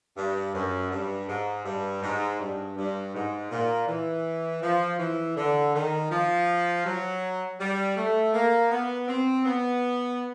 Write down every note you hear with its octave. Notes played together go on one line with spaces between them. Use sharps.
G2
F#2
G2
G#2
G2
G#2
G2
G2
G#2
A#2
E3
F3
E3
D3
D#3
F3
F#3
G3
A3
A#3
B3
C4
B3